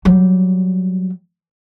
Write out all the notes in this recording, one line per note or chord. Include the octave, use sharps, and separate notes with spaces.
F#3 G3